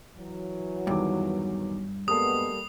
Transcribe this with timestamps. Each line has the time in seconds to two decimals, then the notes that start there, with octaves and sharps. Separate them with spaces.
0.17 E3 F#3
0.87 E2 G2 D#3 D6
2.08 G3 G#3 A#3 B3 A4 D#6